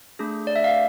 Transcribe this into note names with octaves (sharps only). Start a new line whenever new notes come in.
A3 D4 G#4
D5
E5
F5